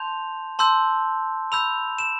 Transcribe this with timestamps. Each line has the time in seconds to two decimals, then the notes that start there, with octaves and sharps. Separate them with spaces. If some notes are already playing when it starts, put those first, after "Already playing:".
Already playing: A5 C6 G6 F7
0.59 A5 C6 E6 G6
1.52 B5 E6 G6 F7
1.99 E7